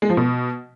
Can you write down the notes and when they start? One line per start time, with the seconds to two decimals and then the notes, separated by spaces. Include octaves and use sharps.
0.02 G#3
0.10 F3
0.17 B2